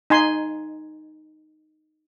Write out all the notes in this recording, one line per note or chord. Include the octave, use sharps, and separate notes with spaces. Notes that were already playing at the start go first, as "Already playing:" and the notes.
D#4 G#5 C6